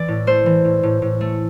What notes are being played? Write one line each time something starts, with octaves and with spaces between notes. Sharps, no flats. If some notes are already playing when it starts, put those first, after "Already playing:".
Already playing: E3 D5
A2
A3 C5
E3
A2
A2
A2
A3